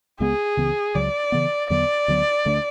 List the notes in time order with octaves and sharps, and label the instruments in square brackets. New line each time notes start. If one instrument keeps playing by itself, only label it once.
[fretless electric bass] C#2 C#3 G#3 B3 [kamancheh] G#4
[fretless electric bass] C#2 C#3 E3 B3
[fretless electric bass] C#2 C#3 F#3 [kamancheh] D5
[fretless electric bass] C#3 E3 B3
[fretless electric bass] E2 D3 F#3 B3 [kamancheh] D5
[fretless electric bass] D2 D3 F#3 B3
D2 D3 A3 D4